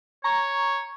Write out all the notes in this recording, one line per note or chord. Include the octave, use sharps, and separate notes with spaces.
C#5 A#5 C#6